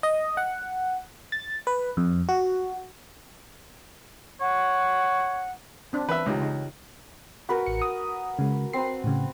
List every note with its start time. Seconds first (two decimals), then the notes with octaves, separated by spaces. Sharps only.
0.03 D#5
0.37 F#5
1.32 A6
1.67 B4
1.97 F2
2.29 F#4
4.41 C#5 F#5
5.93 C4 D4
6.09 E3 B4 E5
6.26 C#2 G#3 D#4 G4
6.40 C#3 D#4
7.49 F#4 A#4 B4 F#5 B5
7.66 A1 C#7
7.82 D#6
8.39 C#3 G#3
8.73 C4 B4 C7
9.04 A2 C#3